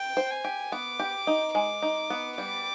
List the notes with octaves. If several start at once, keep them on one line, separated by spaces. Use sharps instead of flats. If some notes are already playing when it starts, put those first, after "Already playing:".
Already playing: G5
C5
G#5
G4
B3 D6
G4
D#4
G#3 D6
D#4
B3
G3 D6